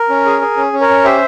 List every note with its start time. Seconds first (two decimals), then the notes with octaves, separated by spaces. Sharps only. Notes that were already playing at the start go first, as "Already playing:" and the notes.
Already playing: A#4
0.10 C#4
0.25 G#4
0.41 G#4
0.57 C#4
0.73 C#4
0.81 A#4 C#5
0.89 C#4
1.05 G4 C5 E5